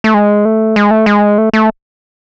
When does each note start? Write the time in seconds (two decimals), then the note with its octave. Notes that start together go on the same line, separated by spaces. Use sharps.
0.04 A3
0.14 G#3
0.45 A3
0.76 G#3
0.91 A3
1.06 G#3
1.38 A3
1.53 A3